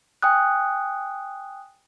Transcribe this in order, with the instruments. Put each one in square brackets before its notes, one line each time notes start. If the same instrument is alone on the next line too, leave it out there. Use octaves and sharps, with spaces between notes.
[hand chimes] G5 G#5 D#6 F#6